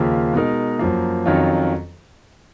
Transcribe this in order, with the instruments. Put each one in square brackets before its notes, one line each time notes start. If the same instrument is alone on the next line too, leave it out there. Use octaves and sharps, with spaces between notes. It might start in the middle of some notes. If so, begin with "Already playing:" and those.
Already playing: [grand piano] D#2 C#3 F3 A#3 F4
B2 G#3 D#4 A#4
F#2 F3 A#3
F2 D#3 F#3 C#4 F4